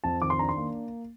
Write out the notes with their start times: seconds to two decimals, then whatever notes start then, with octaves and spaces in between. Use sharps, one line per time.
0.04 F2 A5
0.21 D#3 D6
0.30 C6
0.39 D4 A#5
0.49 C6
0.57 A#3